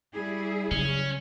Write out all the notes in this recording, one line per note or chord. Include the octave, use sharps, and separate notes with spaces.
G3 E4 G#4
C#3 F#3 C#4